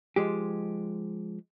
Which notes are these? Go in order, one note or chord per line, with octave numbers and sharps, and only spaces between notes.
F3 G#3 G4